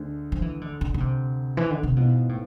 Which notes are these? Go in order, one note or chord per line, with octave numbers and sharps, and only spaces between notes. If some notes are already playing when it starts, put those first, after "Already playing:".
Already playing: D2 D3 G#3
F3
E3
D3
D3
D3
C3
E3
D3
C3
G#2 B2 E3 B3 F4
A2